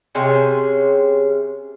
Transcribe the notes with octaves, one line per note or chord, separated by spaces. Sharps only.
C3 C#4 G#4 C5